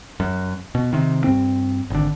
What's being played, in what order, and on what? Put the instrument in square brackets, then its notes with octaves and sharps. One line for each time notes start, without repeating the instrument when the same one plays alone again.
[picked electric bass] F#2
B2
C3 D#3
G2 C4
G#1 D3